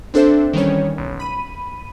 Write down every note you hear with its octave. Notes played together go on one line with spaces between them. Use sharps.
C4 D4 A4 C5 E5
D#3 E3 G3 C#4 C#5
B1
B5 D#7